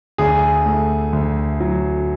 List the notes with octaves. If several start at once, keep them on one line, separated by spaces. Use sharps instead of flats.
D2 G#4
A3
D2
F#3